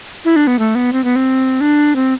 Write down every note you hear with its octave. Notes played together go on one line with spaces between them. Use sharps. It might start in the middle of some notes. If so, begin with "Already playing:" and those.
E4
D4
B3
A3
B3
C4
B3
C4
D4
C4